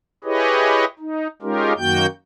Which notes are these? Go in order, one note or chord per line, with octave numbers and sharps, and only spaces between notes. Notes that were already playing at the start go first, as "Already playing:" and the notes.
E4 G4 G#4 B4 C#5 D#5
D#4
G#3 C#4 D#4 F4 G4 A#4
F#2 D#3 A#3 F#4 G5 G6